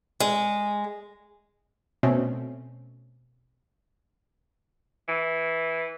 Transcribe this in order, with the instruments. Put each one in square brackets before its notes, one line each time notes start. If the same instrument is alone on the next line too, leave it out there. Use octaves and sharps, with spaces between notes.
[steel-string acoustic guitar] G#3
[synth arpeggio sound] B2 A3 C4 C#4
[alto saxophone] E3